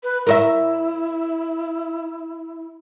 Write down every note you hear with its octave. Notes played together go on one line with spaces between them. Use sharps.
B4
E4 A#4 C5 E5